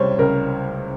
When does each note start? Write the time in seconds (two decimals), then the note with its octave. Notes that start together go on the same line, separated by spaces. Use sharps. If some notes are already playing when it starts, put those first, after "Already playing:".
Already playing: C#2 C3 G3 C5 C#5
0.19 C#2 A#4